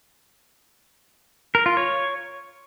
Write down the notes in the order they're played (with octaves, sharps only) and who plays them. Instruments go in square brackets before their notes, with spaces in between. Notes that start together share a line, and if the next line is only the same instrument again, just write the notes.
[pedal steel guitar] A#4
F4
C#5